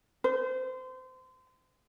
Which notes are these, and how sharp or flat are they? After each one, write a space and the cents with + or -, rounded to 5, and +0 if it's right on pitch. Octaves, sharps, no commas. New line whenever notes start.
C5 -30